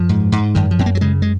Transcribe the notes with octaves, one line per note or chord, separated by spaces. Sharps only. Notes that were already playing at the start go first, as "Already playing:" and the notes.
Already playing: F#2 F3
G#2
G#2
F#2 D#3
F3
F#2 C4
A#3
F#3
C#3 G#3
G#3